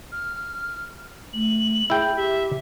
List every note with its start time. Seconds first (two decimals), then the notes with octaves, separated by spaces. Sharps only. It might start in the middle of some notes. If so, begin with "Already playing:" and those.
0.12 F6
1.33 A3 F#7
1.90 E4 G#4 G5
2.16 G4 E5